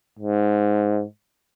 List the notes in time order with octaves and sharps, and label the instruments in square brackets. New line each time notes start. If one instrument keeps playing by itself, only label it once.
[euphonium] G#2